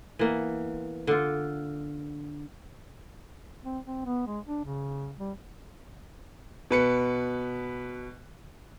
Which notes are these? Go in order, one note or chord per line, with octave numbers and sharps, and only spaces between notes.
E3 A#3 B3
D3 F4
C4
C4
B3
G#3
D4
C#3
G3
B2 B4 C#7